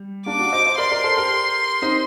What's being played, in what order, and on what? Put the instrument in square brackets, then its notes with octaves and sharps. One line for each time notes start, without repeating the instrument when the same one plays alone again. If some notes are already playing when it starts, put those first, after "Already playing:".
Already playing: [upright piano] G3
[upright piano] A#3 D4 [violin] D6
[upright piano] D4 F#4
C5 D#5
C5 D#5
[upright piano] A#4 D5 [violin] C6
[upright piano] A#4 D5
A4 C5
G4 A#4
C4 D#4